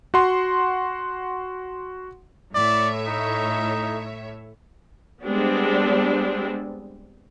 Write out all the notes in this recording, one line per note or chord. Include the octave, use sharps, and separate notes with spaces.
F#4 F#5 C6
A2 C#5 D5 E5
D#4
G3 G#3 B3 C4 D4 G4